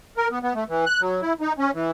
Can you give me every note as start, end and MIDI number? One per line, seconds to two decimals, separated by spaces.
0.17 0.28 70
0.31 0.39 59
0.43 0.53 59
0.55 0.64 57
0.69 0.85 52
0.86 1.01 90
1.01 1.21 54
1.21 1.33 64
1.41 1.53 63
1.58 1.71 61
1.74 1.91 52